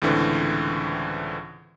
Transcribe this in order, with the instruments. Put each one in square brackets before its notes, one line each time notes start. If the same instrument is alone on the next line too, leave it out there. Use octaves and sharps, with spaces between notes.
[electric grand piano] C#2 A2 D3 E3 C4